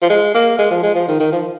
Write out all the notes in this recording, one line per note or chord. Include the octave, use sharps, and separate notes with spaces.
F3
G#3
A#3
G#3
F3
G#3
F3
D#3
D#3
F3